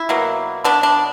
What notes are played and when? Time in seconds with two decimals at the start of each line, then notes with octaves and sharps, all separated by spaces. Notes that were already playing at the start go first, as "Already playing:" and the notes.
Already playing: E4
0.09 B2 F#3 A#3
0.64 B2 F#3 B3 D4
0.83 D4